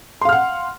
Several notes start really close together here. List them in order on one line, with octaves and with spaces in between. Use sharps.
C6 F5 F6 F#5